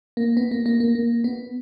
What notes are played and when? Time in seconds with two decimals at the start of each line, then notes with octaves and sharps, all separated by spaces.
0.17 A#3
0.37 B3
0.51 A#3
0.66 A#3
0.80 A#3
0.95 A#3
1.24 B3